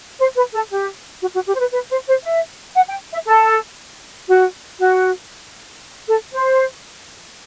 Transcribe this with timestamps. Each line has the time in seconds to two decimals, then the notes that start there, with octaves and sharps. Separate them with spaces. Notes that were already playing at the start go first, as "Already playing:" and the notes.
0.20 C5
0.36 B4
0.54 A4
0.71 G4
1.21 F#4
1.35 F#4
1.47 G4
1.55 C5
1.60 B4
1.73 B4
1.90 C5
2.07 C5
2.23 E5
2.76 F#5
2.89 G5
3.13 E5
3.26 A4
4.28 F#4
4.79 F#4
6.08 A4
6.34 C5